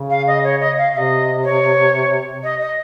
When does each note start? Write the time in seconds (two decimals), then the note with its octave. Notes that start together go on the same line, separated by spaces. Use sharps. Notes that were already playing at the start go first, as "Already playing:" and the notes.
Already playing: C#3
0.10 F5
0.27 D#5
0.44 C#5
0.60 D#5
0.77 F5
0.94 C3 D#5 F5
1.44 C#5
2.43 D#5
2.60 D#5